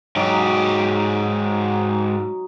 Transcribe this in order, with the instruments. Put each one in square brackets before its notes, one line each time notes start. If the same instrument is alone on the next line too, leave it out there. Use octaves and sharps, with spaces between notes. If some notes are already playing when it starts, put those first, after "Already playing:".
[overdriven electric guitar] G#2 G4 [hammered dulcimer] F#3 D#4